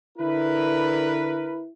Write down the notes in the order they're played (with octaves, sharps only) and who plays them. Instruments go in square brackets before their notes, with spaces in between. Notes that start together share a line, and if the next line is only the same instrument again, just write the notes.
[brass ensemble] D3 A#4 B4 [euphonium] E4